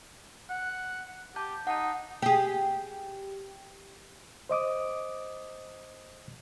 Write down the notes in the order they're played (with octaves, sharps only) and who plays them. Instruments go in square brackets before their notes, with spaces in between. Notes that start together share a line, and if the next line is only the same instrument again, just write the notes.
[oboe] F#5
[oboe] G4 [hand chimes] A5 G6
[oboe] D#4 [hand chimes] F#5 A5
[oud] G4 G#4
[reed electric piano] C5 D#5 D6 D#6